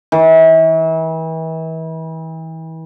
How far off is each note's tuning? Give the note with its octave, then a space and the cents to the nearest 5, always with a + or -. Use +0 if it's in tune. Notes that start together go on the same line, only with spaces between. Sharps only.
E3 -35